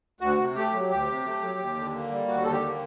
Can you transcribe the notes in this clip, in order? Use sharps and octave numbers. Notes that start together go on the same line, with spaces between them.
D2 F#4
C3
A3 G4
F#3
D2 G4
C3
A3
F#3
D#2
D3
A#3
G3
D#2 F#4
D3 A4
G4
A#3